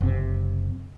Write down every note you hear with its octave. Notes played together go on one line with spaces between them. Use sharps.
F#1 C3